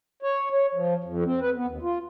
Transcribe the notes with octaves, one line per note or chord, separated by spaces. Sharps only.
C#5
C#5
F3
F2
C4
B4
B3
D#2
F4